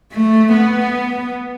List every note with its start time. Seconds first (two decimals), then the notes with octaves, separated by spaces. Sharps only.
0.13 A3
0.53 B3